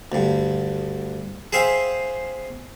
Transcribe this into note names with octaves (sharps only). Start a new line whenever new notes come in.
D2 G2
G#4 C5 E5 F5 G5 G#5